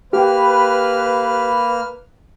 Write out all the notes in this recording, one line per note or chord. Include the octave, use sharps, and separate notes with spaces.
A#3 G4 B4 G5 F6